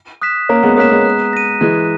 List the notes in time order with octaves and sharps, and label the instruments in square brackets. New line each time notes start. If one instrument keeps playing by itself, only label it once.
[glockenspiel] D#6 F#6 B6 E7
[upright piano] A#3 C#4 [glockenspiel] A#5
[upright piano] G#3 B3
[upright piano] A#3 C#4 [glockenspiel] D#6 F#6 B6 E7
[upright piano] G#3 B3
[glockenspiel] F#6
A#6 D#7
[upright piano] E3 G#3 [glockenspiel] F#6